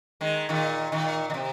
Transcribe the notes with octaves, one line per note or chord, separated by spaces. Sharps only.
D#3 G#3
A#2 D#3
A#2 D#3
D#3
C3